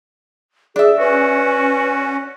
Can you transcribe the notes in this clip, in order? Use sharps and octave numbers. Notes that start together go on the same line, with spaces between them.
D4 G#4 E5
C#4 F#4 B4